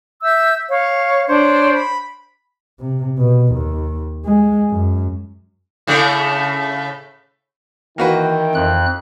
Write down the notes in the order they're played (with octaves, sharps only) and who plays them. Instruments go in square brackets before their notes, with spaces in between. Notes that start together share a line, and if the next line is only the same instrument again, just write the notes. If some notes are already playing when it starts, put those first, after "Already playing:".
[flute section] E5 E6 G6
C#5 F5
D4 C5 C#5
B5
[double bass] C3
B2
D#2
G#3
F#2
[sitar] A2 C#3 A3
[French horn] D#3 [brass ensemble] E3 E4 G5 [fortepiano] A#3 F#4 B4
[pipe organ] F2 F#6